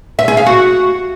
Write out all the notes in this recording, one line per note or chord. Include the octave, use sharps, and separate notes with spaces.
E5
G#4
F5
F#4